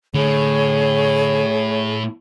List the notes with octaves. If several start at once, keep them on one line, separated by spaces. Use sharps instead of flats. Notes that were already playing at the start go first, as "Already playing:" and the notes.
A2 D3 G#4 C#5